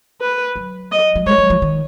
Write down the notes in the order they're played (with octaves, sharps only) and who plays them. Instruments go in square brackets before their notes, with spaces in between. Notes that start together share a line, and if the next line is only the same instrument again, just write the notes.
[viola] B4
[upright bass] F#3
[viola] D#5
[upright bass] F#3
[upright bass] G#3 [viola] C#5
[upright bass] F#3
F3
D#3